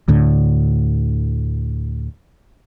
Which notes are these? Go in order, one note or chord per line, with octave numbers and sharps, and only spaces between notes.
D2 A2 D3